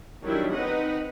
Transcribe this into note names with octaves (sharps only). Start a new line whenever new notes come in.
D#3 F#3 G3 D4 E4
C4 D#4 B4 D#5 F#5